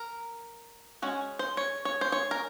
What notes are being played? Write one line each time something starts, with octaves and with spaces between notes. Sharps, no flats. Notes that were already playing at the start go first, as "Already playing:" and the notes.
Already playing: A#4
G#3 C#4 F#4
C5
C#5
C#5
C5
C#5
A#4